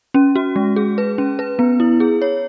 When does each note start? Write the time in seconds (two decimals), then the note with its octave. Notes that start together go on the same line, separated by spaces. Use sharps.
0.14 C#4
0.35 F#4
0.56 G#3
0.76 G#4
0.98 B4
1.18 C#4
1.39 B4
1.59 B3
1.80 E4
2.00 G#4
2.22 C#5